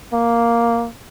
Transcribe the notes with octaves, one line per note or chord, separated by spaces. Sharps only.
A#3